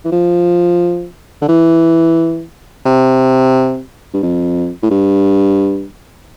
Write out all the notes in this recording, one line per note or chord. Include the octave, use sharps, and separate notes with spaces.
E3
F3
D3
E3
C3
G2
F2
A2
G2